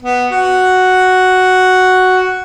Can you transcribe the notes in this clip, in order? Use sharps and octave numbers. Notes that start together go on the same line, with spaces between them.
B3
F#4